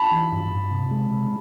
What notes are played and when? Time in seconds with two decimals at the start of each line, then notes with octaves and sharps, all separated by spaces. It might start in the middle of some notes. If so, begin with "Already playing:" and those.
Already playing: A5 B5
0.12 E3
0.32 G2
0.52 G2
0.71 C3
0.91 G#3
1.11 C3